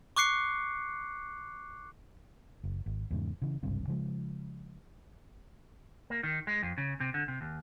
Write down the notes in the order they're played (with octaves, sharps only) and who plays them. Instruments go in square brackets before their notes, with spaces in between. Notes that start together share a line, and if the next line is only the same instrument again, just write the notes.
[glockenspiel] C#6 D6 F#6 C7 C#7
[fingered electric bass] F#1
G#1
E2 G#2 C#3
C#3 E3
G#1 C#2 G2 C3
C#3 F3 G#3
[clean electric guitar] A#3
D#3
G#3
F2
C#3
C3
D3
C3
D#2